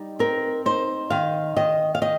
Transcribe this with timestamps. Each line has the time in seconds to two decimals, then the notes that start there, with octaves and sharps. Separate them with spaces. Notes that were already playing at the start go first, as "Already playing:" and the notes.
Already playing: G3 D#4
0.19 C4 A#4
0.66 D#4 C5
1.10 D#3 F5
1.56 D#3 D#5
1.95 F5
2.02 D#3 D#5